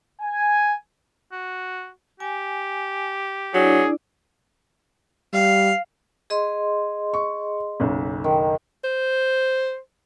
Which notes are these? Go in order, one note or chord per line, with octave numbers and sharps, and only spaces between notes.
G#5
F#4
G4 G#5
F#3 D4 E4 G#4 D5
G3 F5
G#4 D#5 C6
C#6
F#1 B1
D#3
C5